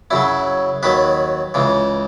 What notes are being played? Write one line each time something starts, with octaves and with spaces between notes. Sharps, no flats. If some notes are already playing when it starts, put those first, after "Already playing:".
F#2 C#3 F#3 E4
D#2 D#3 F#3 B4
C#2 C#3 E3